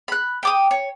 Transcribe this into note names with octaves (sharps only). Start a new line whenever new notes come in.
B5 F#6
G5 D6 D#6
C#5